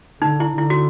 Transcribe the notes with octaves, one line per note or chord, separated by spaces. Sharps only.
D3 D#4
E4
D3 E4
F#4